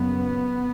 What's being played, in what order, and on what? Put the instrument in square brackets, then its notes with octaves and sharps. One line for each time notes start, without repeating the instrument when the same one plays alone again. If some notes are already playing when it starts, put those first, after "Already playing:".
Already playing: [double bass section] F#1 F#2 C#3 B3